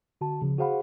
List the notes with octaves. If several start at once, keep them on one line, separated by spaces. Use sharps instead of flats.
D3 F#4 A5
C#3 F3
F#4 G#4 C5 F5 F#5 B5